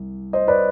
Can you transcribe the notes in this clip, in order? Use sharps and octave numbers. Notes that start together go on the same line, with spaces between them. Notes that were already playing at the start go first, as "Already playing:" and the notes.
Already playing: C2
C5 D#5
B4 D5